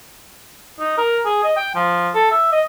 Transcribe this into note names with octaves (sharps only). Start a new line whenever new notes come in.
D#4
A#4
G#4
D#5
G5
F3
A4
E5
D#5